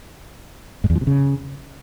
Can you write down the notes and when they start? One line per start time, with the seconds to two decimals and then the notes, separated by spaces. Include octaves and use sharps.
0.84 G#2
0.90 E2
0.95 F3
1.01 C3
1.07 C#3